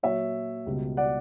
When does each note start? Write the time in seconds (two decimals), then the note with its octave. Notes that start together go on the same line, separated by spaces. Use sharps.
0.03 A#2 F#3 C#5 E5
0.66 C#2 B2 G3
0.97 D5 F#5